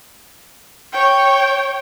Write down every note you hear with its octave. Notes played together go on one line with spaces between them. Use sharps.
C#5 G5